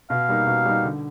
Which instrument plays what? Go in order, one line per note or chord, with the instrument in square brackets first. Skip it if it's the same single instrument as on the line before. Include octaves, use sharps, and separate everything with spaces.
[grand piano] B2 [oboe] F5
[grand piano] G3 A#3 D#4
B2
G3 A#3 D#4
D3